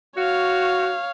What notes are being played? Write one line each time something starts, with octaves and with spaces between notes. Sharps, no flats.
F#4 C#5 F5